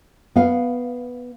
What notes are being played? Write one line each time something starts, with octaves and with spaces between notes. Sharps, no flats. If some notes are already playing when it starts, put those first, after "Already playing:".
B3 F5